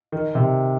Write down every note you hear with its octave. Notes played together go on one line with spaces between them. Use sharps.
D#3
C3